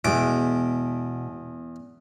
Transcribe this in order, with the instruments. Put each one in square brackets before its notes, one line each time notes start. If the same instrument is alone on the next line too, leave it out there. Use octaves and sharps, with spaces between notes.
[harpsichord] E2 D6 [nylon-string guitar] B2 G#3